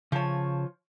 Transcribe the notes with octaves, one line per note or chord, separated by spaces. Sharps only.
C#3 F3 C#5 A5